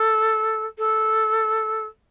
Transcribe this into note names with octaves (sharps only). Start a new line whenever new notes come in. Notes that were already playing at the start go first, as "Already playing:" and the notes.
Already playing: A4
A4